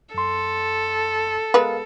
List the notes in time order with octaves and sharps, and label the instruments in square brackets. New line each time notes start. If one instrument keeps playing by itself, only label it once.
[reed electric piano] F#2 C6 [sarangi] A4
[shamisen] G#3 B3 B4 [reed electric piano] A#4 F5